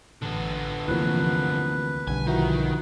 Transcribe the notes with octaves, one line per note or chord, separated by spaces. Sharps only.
A1 D3 B3
D2 C3 E3 F3 A#3 B4
B1 D3 G3 G#5
D#3 F3 E4 F#4